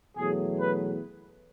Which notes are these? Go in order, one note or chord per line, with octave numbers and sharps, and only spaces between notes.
E2 B2 F#3 A3 G#4
B4